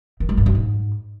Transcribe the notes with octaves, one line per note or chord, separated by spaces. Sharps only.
D#3
G#3
G2
F#2
G#2